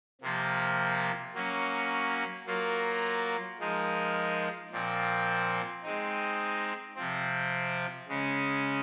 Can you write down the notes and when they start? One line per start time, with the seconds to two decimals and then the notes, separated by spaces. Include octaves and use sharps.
0.21 C3 F3 A#3 F4
1.34 F#3 A#3 C#4
2.46 F#3 A#3 F4 A#4
3.59 F3 G#3 D#4 A#4
4.71 A#2 F3 C4
5.83 G#3 C4 D#4
6.96 C3 F3 C4
8.09 C#3 G#3 C#4